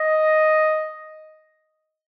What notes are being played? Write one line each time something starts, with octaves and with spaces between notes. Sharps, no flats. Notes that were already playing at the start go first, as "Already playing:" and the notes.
Already playing: D#5